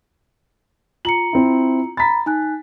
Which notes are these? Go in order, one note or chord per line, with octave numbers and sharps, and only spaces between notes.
F4 A#5 C#7 F#7
C4 E4
A#5 B5 A6 B6
D#4 G#5 F#6